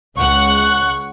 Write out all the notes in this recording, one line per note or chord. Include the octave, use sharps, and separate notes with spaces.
C#2 F#5 C#6 F#6